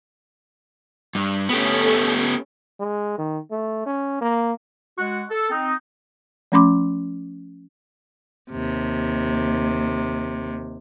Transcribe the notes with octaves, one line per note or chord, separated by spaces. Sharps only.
G2
A3 B3 C#4 G4 A4
G#3
D#3
A3
C#4
A#3
G#3 F#4 F#5 C#6
A4
C4 D#4
F3 A3 C#4 B5 C6 D6
D#2 C3